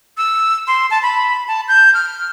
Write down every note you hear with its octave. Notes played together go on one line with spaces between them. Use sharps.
E6
C6
A5
B5
A5
G6
F6